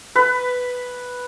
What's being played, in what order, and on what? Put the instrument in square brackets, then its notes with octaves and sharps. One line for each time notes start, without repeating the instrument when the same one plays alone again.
[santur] B4